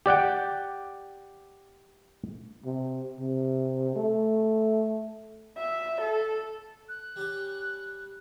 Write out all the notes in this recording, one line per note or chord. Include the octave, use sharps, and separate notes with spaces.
G4 D5 F#5 G5
C3
C3
A3
E5
A4
F#6
G3 C#4 G4